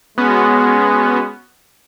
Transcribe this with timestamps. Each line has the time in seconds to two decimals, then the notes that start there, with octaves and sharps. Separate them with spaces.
0.18 G#3 B3 C#4 F#4